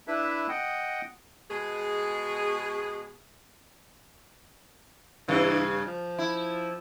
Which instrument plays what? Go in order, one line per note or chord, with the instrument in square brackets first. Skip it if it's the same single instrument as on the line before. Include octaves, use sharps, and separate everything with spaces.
[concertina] D4 E4 B4 E5
D#5 F#5 G5
[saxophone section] B2 G#3 G#4
[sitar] G2 C#3 [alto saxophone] E3
[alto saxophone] F3
[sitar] E4